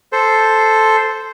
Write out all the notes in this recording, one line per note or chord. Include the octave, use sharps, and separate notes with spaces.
A4 C5